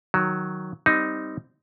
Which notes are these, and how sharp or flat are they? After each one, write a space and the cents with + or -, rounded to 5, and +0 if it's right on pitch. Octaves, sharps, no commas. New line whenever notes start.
D#3 +0 F#3 +0
G3 +0 C4 -20 D#4 +0